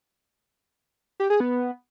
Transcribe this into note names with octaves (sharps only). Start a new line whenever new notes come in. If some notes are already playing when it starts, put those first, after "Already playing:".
G4
G#4
B3